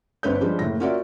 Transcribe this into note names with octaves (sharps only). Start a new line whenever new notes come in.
G1 C4 D4 B4 C#5 G6
F3 G3 G#3 D4 G4
F#1 A2 A#6
C#4 F4 F#4 A#4 D5 E5